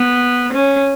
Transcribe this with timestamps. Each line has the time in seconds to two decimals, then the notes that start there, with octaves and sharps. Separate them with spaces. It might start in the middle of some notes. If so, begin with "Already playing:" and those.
Already playing: B3
0.53 C#4